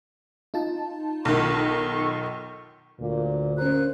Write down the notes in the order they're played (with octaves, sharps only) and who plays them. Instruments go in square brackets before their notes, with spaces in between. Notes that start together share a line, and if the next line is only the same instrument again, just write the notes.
[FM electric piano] D#4 F4 A5
[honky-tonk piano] B1 D#3 [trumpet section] A4 C6 C#6
[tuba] D2 [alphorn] A#2
[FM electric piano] C#4 A#4 [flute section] C5 F#6